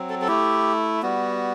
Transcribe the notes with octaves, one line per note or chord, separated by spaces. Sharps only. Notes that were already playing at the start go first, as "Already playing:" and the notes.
Already playing: F#3 C4
A4
A4
A3 E4 G4
G3 B3 F#4